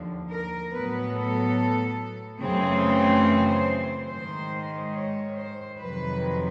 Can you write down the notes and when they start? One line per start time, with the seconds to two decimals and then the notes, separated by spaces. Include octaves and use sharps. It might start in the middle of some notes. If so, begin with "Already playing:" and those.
Already playing: D#2 D3 F3
0.31 A#4
0.73 A2 F#3 B3 B4
1.15 A4
2.41 F#2 C#3 E3 A3 C4 G#4
3.26 C5
4.11 G#2 D#3 G#3 C5
4.94 C#5
5.37 C5
5.80 F2 C3 D#3 F#3 B4